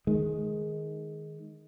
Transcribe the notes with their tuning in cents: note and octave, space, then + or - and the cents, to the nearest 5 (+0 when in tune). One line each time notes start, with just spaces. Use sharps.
D#3 +0 G#3 +10